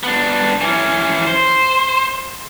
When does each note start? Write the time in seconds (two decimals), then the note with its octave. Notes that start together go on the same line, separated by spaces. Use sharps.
0.03 B3 D4
0.61 E3 C#4
1.27 C5